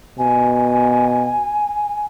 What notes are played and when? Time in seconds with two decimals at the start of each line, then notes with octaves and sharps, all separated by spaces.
0.19 B2 G#5